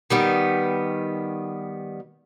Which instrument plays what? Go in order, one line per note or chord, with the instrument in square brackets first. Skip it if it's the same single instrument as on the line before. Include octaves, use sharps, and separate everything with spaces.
[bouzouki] D#3 G3 B3